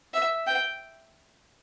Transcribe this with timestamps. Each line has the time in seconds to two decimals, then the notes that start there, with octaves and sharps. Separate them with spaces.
0.14 E5
0.47 G5